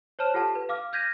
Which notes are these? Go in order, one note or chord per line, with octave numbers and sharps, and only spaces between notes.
C5 C#5 A5 F6 E7
F4 G4 A4 F#5 A5
B4
F5 D6 F6
F6 G6 G#6 A#6 B6 D#7